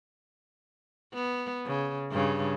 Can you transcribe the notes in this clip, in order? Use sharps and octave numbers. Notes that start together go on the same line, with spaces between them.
B3
C#3
G2 C#3